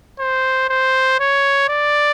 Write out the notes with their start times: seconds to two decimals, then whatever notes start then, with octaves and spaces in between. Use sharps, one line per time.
0.19 C5
0.69 C5
1.20 C#5
1.69 D5